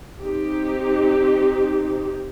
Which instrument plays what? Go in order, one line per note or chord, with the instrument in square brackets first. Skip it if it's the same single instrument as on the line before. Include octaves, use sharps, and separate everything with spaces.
[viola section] C4 D#4 G4